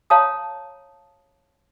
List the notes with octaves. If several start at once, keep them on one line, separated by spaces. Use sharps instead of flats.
C#5 F5 A5 A#5 D#6